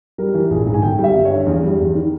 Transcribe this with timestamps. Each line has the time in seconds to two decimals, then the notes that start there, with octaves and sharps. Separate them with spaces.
0.18 G3 A#4
0.34 E3
0.51 A#1 G#4
0.66 G#2
0.74 G#5
0.82 G1 G5
0.99 G3
1.04 E5
1.15 G1
1.25 C#5
1.31 G2
1.46 E2
1.63 G3
1.79 E2
1.95 D#3